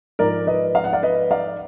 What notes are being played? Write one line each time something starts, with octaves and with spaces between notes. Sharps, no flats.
G#2 F3 A#4 D5
B4 D#5
F5
F#5
D5 F5
B4 D#5
D5 F5